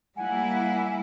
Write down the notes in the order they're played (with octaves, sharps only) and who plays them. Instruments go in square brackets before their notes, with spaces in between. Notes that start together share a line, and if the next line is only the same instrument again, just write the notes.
[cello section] G3 A#3 E4 [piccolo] F#5 [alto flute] G#5